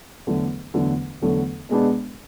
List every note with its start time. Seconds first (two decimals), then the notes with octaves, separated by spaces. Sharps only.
0.26 E2 D3 F#3 A3
0.74 E2 D3 F#3 A3
1.21 E2 D3 F#3 A3
1.69 B2 G#3 B3 D4